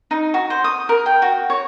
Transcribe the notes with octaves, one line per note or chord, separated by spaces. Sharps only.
D#4
F#4
C5
D#6
A#4
G5
F#4
C#5